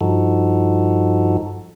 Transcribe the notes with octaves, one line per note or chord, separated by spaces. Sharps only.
G2 F3 D#4 F#4 A4